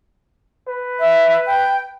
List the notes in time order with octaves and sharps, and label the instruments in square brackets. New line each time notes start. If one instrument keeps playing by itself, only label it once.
[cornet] B4
[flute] E5
G5